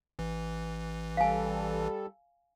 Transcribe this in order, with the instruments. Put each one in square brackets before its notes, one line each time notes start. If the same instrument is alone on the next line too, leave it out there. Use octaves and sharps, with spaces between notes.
[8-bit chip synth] A1 E3
[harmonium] G3 A4 [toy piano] F5 G#5